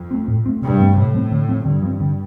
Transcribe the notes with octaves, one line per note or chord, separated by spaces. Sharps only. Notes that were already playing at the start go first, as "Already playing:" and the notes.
Already playing: F2
A3 C4
A2
A3 C4
G2 C3
F3 A3 C4
A2 C3
F3 A3 C4
D3
F3 C4
G2 D3
F3 C4
D3